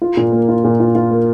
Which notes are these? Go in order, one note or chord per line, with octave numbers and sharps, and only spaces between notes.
F4
A#2
A#3
F4
A#2
F4
F4
A#3